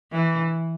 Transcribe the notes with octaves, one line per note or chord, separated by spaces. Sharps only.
E3